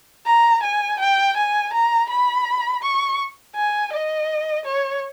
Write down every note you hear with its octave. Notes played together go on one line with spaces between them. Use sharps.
A#5
G#5
G5
G#5
A#5
B5
C#6
G#5
D#5
C#5